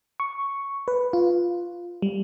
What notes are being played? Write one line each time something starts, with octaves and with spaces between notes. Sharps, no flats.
C#6
B4
F4
G3